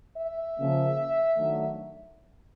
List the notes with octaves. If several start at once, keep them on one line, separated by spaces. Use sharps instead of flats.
E5
C#3 F3 A#3 C#4
D#3 F#3 A3 D4